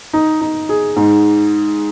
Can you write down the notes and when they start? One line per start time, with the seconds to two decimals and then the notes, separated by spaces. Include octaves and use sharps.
0.13 D#4
0.41 D#4
0.69 G#4
0.96 G#2